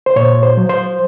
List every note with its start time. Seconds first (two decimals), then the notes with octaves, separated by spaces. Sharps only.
0.06 C5
0.16 A#2 C#5
0.43 C5
0.57 F#3
0.69 C5